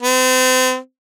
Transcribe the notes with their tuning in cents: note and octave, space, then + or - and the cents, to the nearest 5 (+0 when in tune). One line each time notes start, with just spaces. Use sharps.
C4 -35